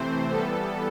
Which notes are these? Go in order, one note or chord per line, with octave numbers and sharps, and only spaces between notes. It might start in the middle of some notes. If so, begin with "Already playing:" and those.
Already playing: C3 E3 A3 C4 C5
E3 G3 B3 A4